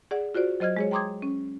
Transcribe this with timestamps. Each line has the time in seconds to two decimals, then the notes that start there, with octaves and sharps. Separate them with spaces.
0.11 G#4 D5 F#5
0.34 F4 F#4 C5 D5
0.60 F#3 C5 D#5 F6 G#6
0.77 G#3 G#4 C#5
0.91 G5 A#5 C6 D6 D#6 G#6
1.22 C#4